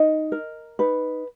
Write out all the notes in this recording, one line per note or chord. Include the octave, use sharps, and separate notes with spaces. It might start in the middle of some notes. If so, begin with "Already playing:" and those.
Already playing: D#4 D#5
A#4
D#4 B4